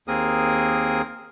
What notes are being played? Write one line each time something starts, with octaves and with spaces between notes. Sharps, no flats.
D#2 A#3 C4 G#4 A#4 D#6